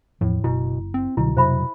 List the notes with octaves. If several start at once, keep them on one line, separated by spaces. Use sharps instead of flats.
E2 A2 F3
F#1 B2 E4
C4
C2 B2 D3 F#3 E4
F2 C3 F#3 C5 E5 B5